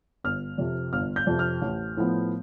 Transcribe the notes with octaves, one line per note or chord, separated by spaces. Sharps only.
G1 F6
F2 C3
G1 F6
G6
F2 C3
F6
A1
A2 F3 B3